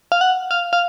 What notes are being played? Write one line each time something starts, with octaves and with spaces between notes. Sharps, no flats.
F5
F#5
F5
F5